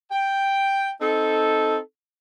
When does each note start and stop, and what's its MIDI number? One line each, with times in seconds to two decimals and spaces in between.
0.11 0.91 79
1.01 1.77 60
1.01 1.77 63
1.01 1.77 69